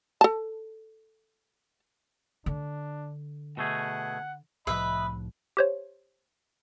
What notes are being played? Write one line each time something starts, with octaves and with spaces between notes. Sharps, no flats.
A4 A5
D3 D4
B2 A3 G#4 F#5
C2 A2 F3 B4 D#5 E5 B5
G4 C5 C#5